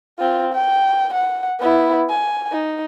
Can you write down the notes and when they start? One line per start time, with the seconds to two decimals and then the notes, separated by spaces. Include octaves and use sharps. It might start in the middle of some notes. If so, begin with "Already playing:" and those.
0.19 C4 F4
0.53 G5
1.14 F#5
1.59 B3 E4
2.10 G#5
2.51 D#4